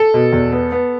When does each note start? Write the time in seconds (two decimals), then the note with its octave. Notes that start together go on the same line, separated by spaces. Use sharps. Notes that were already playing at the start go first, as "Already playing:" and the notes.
Already playing: A4
0.14 B2
0.32 E2
0.52 B3
0.72 B3